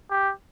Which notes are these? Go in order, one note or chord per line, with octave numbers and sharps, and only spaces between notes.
G4